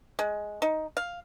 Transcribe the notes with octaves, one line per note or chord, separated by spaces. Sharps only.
G#3
D#4
F5